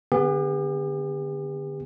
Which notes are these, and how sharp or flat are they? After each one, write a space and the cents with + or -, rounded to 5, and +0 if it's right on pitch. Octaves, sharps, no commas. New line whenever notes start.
D3 +0 B3 +0 G4 +45